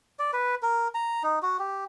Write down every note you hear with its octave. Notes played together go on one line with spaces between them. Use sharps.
D5
B4
A#4
A#5
D#4
F#4
G4